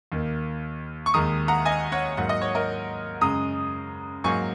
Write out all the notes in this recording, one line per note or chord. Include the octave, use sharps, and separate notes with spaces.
D#2 D#3 A#3
C#6
D#2 D#3 G#3 A#5 D#6
F#5 A#5
D#5 G#5
C#5 F#5
G#2 F#3 A#3 F#5
D#5
C#5
A#4 D#5
F#2 C#3 G#3 A#5 D#6
G#2 F#3 A#3 G#5 C#6